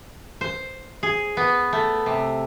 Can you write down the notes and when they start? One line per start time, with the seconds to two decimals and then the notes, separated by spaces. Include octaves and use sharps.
0.41 C5
1.03 G#4
1.37 B3
1.73 A3
2.06 C3